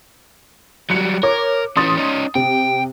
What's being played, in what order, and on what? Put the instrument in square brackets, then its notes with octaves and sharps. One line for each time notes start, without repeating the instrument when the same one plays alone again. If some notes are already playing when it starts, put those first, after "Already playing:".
[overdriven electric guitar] F#3 G3 [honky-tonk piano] F#6 C#7
[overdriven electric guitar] A#4 [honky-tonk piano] C#5 D6
[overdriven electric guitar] E3 C#4 [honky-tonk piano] C6 D#6 A6
[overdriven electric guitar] C#4 D#4
[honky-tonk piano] C3 [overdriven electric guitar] G5